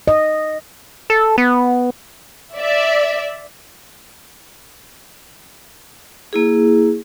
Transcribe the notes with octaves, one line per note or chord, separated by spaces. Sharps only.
D#5
A4
B3
D5 E5
A#3 E4 G#4